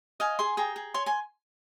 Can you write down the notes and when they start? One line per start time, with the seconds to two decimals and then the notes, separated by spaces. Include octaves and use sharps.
0.20 D#5 F5 G#5
0.39 G#4 G#5 C6
0.57 G#4 G5 A#5
0.76 G#4
0.94 C#5 G#5 C6
1.06 G#5 C6